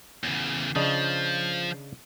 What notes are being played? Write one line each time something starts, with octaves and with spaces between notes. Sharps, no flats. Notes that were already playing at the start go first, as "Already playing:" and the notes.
E2 C#3
C#3 F3 D4 D#5